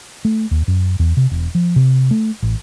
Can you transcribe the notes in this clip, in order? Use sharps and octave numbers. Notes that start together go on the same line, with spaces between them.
A3
D#2
F#2
E2
C3
E1
F3
C3
A3
A1